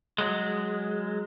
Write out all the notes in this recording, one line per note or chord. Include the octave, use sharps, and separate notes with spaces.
F#3 G#3